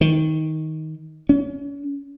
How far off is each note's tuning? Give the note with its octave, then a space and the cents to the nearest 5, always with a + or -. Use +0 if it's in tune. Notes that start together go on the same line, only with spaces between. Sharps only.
D#3 +15
C#4 +35